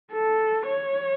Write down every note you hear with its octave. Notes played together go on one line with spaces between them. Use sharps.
A4
C#5